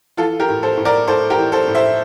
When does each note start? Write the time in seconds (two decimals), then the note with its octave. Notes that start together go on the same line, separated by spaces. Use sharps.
0.17 E3 F4 A4
0.40 G4 A#4
0.48 A2
0.63 A4 C5
0.77 A2
0.85 A#4 D5
1.07 A2 A4 C5
1.30 G4 A#4
1.37 E3
1.52 A4 C5
1.67 A2
1.75 C5 E5